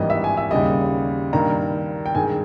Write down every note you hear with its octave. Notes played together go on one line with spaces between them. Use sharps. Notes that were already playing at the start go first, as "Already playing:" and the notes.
Already playing: G#1 G2 E3 G3 A#3 D#5
E5
G#5
E5
D#2 C#3 G3 D#5
G2 D#3 A#3 A#5
G5
G2 D#3 G#3 G#5